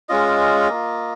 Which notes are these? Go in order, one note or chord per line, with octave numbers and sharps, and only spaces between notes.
G#3 C#4 F4 D#5
A#3 F4